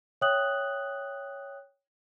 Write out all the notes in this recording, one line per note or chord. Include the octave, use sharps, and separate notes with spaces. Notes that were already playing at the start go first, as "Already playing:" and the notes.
C#5 E5 G5 D#6 F#6 F#7